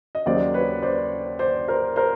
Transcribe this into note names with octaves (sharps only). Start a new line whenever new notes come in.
D#5
D#2 C#3 F#3 A#3 C5 D5
B4 C#5
C5 D5
C5 D5
A#4 C5
A#4 C5